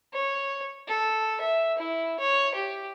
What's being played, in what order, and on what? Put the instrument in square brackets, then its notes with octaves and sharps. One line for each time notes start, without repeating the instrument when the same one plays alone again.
[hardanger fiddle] C#5
A4
E5
E4
C#5
G4